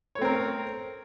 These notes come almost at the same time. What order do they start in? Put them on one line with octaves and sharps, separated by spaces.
C#5 A3 C4 A#4